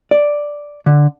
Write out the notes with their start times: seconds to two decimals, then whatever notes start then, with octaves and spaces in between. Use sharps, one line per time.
0.11 D5
0.86 D3